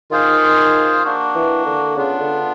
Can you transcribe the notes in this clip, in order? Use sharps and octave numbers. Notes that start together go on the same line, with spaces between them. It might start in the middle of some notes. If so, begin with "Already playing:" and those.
D#3 F4 G#4 C5 F5
A#3 D4 F#4
E3
D3
C#3 B3 D4 F4
D3